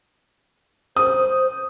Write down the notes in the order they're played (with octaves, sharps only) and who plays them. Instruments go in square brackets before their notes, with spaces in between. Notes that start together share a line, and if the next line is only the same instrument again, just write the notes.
[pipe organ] C5 [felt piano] D#6